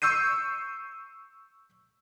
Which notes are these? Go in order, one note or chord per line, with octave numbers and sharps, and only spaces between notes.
C#6 E6 G6 C7 D#7